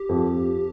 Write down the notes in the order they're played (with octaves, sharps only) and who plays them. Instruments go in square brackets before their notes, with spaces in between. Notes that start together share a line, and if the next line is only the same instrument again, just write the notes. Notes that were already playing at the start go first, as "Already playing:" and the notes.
Already playing: [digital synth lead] G4
[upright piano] F2